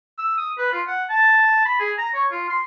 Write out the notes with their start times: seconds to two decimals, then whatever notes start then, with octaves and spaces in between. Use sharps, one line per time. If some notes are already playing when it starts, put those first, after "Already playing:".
0.19 E6
0.38 D#6
0.58 B4
0.73 F4
0.88 F#5
1.09 A5
1.66 B5
1.80 G#4
1.98 A#5
2.15 C#5
2.32 F4
2.50 C6